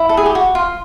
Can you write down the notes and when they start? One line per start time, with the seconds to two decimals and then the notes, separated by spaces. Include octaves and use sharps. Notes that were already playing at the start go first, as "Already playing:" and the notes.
Already playing: E4
0.09 A4
0.17 G#4
0.26 G4
0.35 F#4
0.55 F4